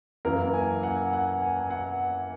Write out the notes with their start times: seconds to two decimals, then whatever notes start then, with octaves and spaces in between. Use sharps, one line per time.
0.25 F#2 E3 A#3 A#4
0.54 G#5
0.83 F#5
1.13 F#5
1.42 G#5
1.60 G#5
1.70 F#5